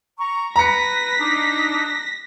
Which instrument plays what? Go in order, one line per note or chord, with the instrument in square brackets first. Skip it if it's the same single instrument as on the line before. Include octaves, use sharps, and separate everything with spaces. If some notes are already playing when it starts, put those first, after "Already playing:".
[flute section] A#5 C#6
[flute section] B4 [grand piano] A#5 C#7 [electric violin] A#6 B6
[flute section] D4 D#4